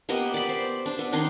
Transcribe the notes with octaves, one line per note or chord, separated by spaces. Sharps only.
A#3 B3 G4 D#5
D5 B5
C5
D4
B3
D#3 D4 D#4 C6